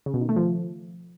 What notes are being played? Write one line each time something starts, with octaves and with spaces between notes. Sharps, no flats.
C#3
B2
D#3
A3
F3